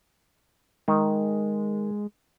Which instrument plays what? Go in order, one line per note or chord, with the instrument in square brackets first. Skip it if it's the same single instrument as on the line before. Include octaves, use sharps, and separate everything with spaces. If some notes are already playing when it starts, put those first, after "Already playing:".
[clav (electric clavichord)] D#3 [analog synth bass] G#3